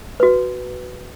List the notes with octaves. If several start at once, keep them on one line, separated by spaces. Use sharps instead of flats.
F#4 B4